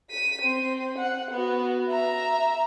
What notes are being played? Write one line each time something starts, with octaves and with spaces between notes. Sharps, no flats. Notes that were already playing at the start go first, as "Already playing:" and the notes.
B6 D#7
C4
F#5
B3 F#4
E5 A#5